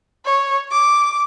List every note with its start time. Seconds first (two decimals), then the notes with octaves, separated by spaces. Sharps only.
0.25 C#5
0.71 D6